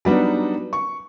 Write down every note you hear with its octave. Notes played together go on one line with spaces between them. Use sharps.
F#3 G3 B3 D4 D#4
C#6